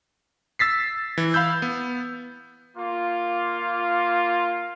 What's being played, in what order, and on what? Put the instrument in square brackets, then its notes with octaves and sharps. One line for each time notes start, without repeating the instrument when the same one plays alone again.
[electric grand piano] E6 A6 B6 C7
E3
F5 B5 E6 G6
B3
[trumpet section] A#3 F4